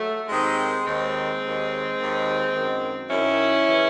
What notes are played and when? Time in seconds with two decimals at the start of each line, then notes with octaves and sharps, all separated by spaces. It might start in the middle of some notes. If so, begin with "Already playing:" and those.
Already playing: F#3 A3
0.29 D#2 D#3 G#3 C4
0.85 D#2 D#3 G#3 C4
1.40 D#2 D#3
1.96 D#2 D#3
2.52 F#2 D#3
3.08 F#2 D#3 C#4 E4
3.67 C#3 E3